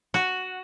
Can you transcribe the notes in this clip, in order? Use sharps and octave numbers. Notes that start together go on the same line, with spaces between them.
F#4